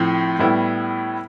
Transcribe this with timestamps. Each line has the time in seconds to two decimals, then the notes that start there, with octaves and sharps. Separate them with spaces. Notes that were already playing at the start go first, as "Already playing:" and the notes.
Already playing: A2 F3 C4
0.39 A2 G3 B3 E4